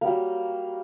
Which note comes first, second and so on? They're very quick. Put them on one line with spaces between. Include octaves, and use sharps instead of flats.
A#3 G3 F#3